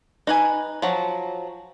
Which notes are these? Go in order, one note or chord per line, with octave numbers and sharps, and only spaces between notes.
D#4 B4 G#5
F3 F#3